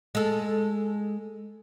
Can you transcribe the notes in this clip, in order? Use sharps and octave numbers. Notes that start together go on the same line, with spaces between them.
G#3 A4